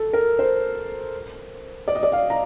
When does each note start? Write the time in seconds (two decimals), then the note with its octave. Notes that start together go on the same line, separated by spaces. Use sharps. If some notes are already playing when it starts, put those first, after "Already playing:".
Already playing: A4
0.13 A#4
0.39 C5
1.88 D5
1.95 D#5
2.03 D5
2.12 F5
2.30 A#5